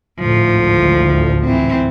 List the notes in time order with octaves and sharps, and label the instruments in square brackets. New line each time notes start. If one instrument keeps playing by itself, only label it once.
[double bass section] G#1 D2 A2 [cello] F3
[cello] E3 C4